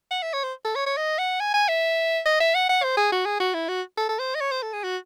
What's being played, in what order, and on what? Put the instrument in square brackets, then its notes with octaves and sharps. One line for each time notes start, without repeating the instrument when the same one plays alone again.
[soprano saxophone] F#5
E5
C#5
C5
A4
C#5
C#5
D#5
F#5
G#5
G#5
E5
D#5
E5
F#5
F#5
C5
G#4
F#4
G#4
F#4
E4
F#4
A4
A4
C5
D#5
C#5
C5
A4
G#4
F#4